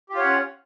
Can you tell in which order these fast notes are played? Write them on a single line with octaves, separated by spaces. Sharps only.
G4 F4 C#5 F#5 C#4